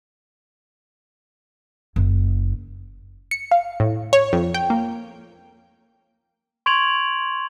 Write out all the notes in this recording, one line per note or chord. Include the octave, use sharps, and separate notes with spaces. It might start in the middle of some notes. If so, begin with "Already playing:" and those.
F#1
C#7
F5
A2
C#5
F2
G5
A#3
C6 C#6 G#6 D7 F7 F#7